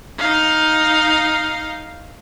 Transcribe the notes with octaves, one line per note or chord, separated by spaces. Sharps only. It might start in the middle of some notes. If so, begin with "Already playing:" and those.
D#4 F5